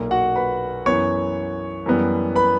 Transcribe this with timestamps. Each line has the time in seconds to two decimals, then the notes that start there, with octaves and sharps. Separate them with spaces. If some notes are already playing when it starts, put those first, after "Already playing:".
Already playing: B1 A#2 A#3
0.11 F#4 F#5
0.36 B4 B5
0.86 F#2 E3 B3 C#5 C#6
1.86 F#2 E3 G3 B3
2.36 B4 B5